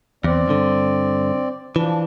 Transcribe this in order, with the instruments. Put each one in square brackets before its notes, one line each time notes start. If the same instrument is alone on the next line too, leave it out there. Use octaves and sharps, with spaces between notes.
[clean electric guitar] E2 [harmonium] C4 D5
[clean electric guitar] G2 D3
[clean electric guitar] E3 [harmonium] F3 D4